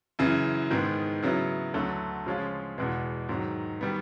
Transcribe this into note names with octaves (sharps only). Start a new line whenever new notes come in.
F#2 C#3 E3
G#2 D#3 G#3 B3
C#3 F#3 B3 E4
D2 D3 F#3 A3
C#3 F3 G#3 C#4 F4
E2 B2 G#3 B3
G#2 D#3 F#3
D#3 G3 B3